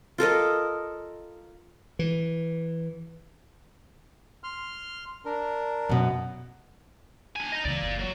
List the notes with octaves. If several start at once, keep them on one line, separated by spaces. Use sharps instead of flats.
F4 A4 A#4 D#5
E3
C6 F6
D4 A#4
F#2 B2
D4 G#5
D#5 A#5
C#2 C#3 E3 A#3 D5
F#1
F#3